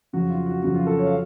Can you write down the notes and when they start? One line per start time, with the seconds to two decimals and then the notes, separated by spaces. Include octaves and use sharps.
0.13 F2 C#3 F#3 F#4
0.30 F4
0.46 F#4
0.62 F2 C#3 F#3 F#4
0.75 F4
0.87 A4
0.99 C#5
1.07 F5